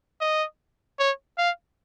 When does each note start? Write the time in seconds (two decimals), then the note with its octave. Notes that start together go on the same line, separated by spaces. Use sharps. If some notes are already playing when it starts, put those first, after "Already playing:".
0.21 D#5
0.99 C#5
1.38 F5